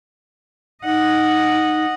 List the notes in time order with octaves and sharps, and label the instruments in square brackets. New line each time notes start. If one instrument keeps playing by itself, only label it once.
[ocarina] D#4 [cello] D#5 F#5